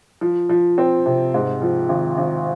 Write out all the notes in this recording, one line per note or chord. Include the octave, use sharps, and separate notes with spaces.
F3
F3
C4
C3
G#2
F3
G#1
G#1